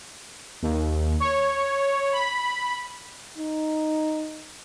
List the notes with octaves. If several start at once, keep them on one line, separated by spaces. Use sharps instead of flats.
D#2
C#5
B5
D#4